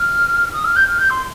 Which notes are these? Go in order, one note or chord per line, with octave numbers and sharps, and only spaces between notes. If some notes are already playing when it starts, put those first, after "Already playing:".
Already playing: F6
D#6
F6
G6
F6
G6
C6